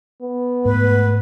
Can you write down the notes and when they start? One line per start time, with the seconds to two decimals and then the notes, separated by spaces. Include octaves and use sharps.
0.22 B3
0.65 G#2 A3 B4